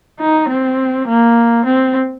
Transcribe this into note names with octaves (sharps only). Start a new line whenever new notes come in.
D#4
C4
A#3
C4